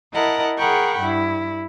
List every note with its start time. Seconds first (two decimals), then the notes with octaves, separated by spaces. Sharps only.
0.13 E4 A#4 D#5 F#5 A5
0.57 G#4 A#4 F#5 G5 B5 C#6
0.98 G2 E4